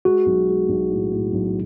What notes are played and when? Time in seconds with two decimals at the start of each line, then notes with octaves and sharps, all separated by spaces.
0.05 G#3 F#4
0.26 B1
0.49 G#3
0.69 B1
0.91 A2
1.12 A2
1.32 B1